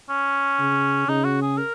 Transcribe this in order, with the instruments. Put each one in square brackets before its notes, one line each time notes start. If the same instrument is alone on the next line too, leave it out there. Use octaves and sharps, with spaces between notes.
[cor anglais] C#4
[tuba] C#3
[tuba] C#3 [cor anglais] D#4
[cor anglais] F#4
G#4
A#4